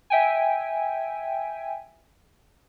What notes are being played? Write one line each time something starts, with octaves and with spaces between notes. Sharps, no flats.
E5 G5 G#5